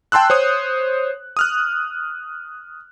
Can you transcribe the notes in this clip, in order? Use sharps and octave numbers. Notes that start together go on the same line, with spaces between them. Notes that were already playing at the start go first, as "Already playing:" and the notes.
G5 A5 C6 E6 F#6
C5 C#5 D#6
D#6 F6 F#6